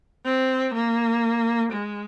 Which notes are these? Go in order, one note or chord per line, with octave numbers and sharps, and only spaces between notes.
C4
A#3
G#3